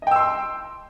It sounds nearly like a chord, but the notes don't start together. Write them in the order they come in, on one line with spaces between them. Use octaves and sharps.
D#5 G5 E6 C6